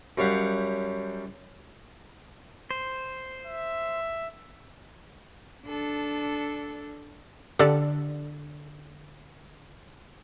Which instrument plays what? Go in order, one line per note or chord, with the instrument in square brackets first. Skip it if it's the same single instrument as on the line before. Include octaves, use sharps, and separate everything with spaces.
[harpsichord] F#2 G3 C#5 F5 F#5
[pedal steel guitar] C5
[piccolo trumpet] E5
[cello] D4 A4
[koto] D3 [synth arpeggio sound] G4 A4 D5